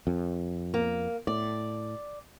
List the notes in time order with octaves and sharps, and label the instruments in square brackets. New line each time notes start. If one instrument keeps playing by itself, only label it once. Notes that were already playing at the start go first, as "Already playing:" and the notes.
[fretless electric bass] F2
[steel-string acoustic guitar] A#3
[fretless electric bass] A2 [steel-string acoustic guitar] D5